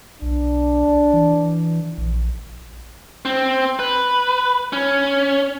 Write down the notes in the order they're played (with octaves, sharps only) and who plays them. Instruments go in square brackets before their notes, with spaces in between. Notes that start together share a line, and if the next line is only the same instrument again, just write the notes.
[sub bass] B1 [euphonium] D4
[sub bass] E3
A#1
[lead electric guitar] C4
B4
C#4